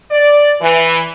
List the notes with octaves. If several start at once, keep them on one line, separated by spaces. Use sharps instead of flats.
D5
E3